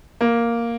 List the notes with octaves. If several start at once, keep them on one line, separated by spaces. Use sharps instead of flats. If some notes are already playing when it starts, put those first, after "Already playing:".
A#3